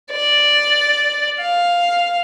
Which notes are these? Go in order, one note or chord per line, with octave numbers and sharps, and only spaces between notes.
D5
F5